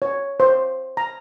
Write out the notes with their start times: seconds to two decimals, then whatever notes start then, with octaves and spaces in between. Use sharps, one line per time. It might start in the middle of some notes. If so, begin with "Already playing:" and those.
0.02 C#5
0.40 C5
0.97 A#5